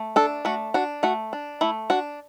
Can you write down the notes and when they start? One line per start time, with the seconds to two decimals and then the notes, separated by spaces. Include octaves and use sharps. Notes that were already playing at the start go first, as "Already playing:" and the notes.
Already playing: A3
0.16 D4 A4
0.45 A3 F#4
0.74 D4 F#4
1.03 A3 F#4
1.33 D4
1.61 A3 E4
1.90 D4 F#4